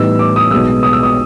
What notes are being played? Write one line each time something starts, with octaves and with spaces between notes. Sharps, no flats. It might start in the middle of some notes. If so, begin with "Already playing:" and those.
Already playing: A2 E3 G3 B3 D#4 E6
D6
D#6
B1 B2 G#3 B3 E6
D#6
E6
D#6